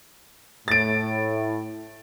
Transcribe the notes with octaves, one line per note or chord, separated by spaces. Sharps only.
A2 A6 D7